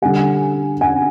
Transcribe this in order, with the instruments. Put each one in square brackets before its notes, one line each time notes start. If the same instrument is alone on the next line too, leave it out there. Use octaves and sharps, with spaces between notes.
[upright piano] D3 G3 F#5 G#5
F#5 G#5